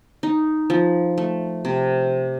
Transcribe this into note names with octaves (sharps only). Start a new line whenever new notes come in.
D#4
F3
A3
C3